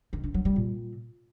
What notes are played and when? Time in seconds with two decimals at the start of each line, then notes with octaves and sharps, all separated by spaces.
0.13 D#3
0.24 D3
0.34 F#3
0.45 G3
0.56 A#2